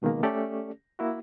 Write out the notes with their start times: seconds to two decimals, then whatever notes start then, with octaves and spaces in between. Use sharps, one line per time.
0.02 C#2 B2 D#3 G#3 A#3
0.23 A3 C#4 G4 A4 D5
0.99 A#3 E4 F#4